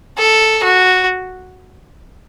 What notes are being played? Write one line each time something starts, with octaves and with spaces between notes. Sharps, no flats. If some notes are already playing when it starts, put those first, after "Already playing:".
A4
F#4